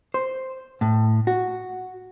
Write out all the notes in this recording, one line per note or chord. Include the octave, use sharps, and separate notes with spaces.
C5
A2
F#4